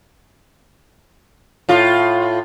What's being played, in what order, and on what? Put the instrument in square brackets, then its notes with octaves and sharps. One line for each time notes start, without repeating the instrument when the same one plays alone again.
[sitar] A2 F4